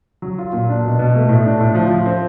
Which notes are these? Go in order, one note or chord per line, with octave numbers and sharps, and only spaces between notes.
F#3
F4
A#2
D4
B2
B2
A3
A2
D4
A2
F3
F3
C4